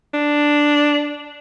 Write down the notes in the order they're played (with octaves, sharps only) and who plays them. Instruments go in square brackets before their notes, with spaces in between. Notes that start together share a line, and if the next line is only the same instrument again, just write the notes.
[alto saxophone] D4